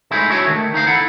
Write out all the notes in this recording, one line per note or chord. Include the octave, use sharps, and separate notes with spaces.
G#3 A3 D#4 E4 G#4
D4 F#4 G#4 C#5 E5
D#3 F#3 A3
D2 D#4 E5 F5
E4 A4 F#5